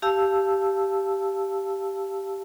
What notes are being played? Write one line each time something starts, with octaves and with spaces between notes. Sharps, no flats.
G4 F5 A5 E6